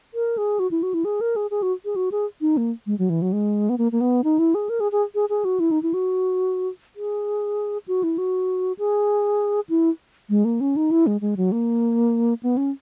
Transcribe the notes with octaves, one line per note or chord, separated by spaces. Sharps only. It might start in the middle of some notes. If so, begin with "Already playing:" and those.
A#4
G#4
F#4
E4
F#4
E4
G#4
A#4
G#4
G#4
F#4
G#4
F#4
G#4
D#4
A#3
G#3
F#3
E3
F#3
G#3
B3
A#3
A#3
B3
D#4
E4
G#4
A#4
G#4
G#4
G#4
G#4
F#4
E4
D#4
E4
F#4
G#4
F#4
E4
F#4
G#4
E4
G#3
A#3
C#4
D#4
E4
G#3
G#3
F#3
A#3
B3
C#4